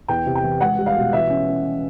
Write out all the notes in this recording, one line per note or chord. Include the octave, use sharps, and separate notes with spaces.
E2 G5
C3
G5
E3
C#2 F#5
G3
F5
B2
E3 E5
C#4
C#4